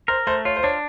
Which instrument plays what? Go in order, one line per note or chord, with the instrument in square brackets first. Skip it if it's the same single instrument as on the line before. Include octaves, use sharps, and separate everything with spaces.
[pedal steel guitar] A#4 [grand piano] C5
[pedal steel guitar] A3 [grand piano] C5
[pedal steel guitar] F4 [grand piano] C#5
[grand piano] C5
[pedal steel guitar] D4 [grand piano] C#5